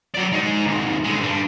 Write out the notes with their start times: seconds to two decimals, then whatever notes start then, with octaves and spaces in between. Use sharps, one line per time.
0.14 F#3 D5
0.32 G#3 D#4
0.67 D#2 G#2
1.04 D3 G#3
1.20 G2 D4